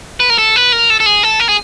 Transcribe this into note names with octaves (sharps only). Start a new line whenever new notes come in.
B4
A#4
A4
B4
A#4
A4
A4
G#4
A4
A#4
G#4